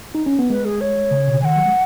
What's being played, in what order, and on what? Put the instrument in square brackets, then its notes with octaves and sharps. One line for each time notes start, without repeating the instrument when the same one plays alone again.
[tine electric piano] D#4
C#4
B3
[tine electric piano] G#3 [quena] B4
[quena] G#4
C#5
[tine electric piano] C#3
B2
C#3
[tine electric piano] D#3 [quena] F#5 G#5
[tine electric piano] F#3
G#3